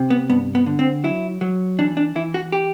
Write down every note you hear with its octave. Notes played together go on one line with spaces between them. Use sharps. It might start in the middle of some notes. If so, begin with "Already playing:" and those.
Already playing: C3
B3
G2 B3
B3
D3
C4
F#3 E4
F#3
E3 D4
D4
E3 E4
F#4
G4